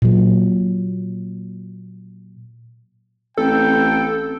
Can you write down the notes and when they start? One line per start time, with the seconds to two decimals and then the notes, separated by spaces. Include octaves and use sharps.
0.02 A#2 F#3
3.38 A1 C4 A4 G5